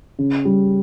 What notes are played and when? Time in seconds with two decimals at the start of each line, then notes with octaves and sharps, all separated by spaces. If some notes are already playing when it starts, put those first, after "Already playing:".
0.19 C#3
0.45 G3